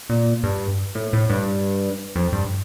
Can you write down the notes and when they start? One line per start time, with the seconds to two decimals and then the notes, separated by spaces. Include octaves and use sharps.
0.10 A#2
0.44 G2
0.95 A2
1.13 A2
1.30 G2
2.16 F2
2.33 G2